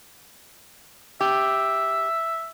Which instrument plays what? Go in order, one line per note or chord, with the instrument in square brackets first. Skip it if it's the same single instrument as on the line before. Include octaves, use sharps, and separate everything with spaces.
[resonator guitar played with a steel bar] G4 [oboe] E5